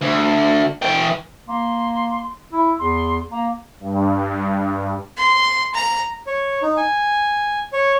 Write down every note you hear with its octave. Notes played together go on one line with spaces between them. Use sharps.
D2
E3 G5
A#3 C6
E4
E2 C6
A#3 A#5
G2
C6
A#5
C#5
D#4
G#5
C#5